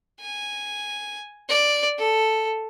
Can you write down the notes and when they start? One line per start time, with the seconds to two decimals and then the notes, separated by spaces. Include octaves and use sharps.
0.20 G#5
1.49 D5
1.98 A4